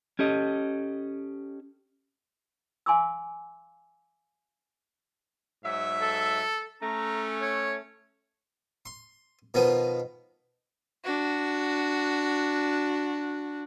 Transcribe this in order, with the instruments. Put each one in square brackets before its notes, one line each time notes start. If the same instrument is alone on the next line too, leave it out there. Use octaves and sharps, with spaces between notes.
[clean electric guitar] C#4 G4 A4 D#5
[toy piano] F5 G#5 C6 D6 E6
[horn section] G#2 F#3 E5
[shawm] A4
[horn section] A3 C#4 [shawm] A#5
[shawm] C#5
[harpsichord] C6
B2 D#3 F3 B3
[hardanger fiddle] D4 F#4